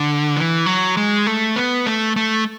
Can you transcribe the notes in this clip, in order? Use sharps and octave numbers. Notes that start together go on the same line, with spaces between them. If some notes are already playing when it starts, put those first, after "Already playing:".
Already playing: D3
E3
F#3
G#3
A3
B3
A3
A3